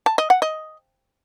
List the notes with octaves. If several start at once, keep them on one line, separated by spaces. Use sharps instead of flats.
A5
D#5
F#5
D#5